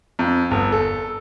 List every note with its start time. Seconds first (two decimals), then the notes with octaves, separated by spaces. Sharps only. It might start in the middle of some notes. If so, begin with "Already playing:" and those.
0.19 F2
0.51 G1
0.72 A4